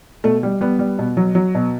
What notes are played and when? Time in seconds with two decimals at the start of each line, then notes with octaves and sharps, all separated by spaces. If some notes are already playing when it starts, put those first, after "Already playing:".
0.24 B2 A3
0.43 G3
0.61 G3 B3
0.79 G3
0.99 B2
1.17 F#3
1.35 F#3
1.55 B2